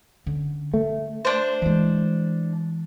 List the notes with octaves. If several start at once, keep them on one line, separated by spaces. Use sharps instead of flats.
D3 C#4
A3
D4 C5
E3 G#3